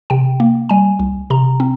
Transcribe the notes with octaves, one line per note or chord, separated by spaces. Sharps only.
C3 G5
A#3
G3 G#5
C2
C3 A#5
C4